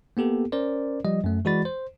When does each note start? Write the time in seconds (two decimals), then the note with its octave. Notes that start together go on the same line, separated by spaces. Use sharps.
0.17 A#3 B3 G4 A4
0.52 C#4 A#4 C5 D5
1.05 F3 G3 D#5
1.24 F#2 A3
1.45 E3 G#3 F#4 D5 B5 A6
1.65 C5